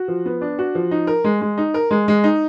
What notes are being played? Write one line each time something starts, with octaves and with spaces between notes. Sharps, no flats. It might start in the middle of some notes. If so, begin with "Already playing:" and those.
Already playing: F#4
F3
B3
D4
F#4
F3
D#4
A#4
G#3
G#3
D#4
A#4
G#3
G#3
D#4